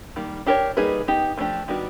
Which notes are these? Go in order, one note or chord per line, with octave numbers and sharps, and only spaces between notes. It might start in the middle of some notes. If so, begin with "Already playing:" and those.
D#3 G3 A#3
D4 G4 A#4 C#5
G3 A#3 D#4 G#4 B4
B3 D#4 G4
F3 A3 D4 G4
D#3 G3 B3 D4 F#4